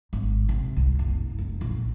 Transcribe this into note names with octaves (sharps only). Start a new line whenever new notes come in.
G#1
C3
C2
F#1
F1
A#1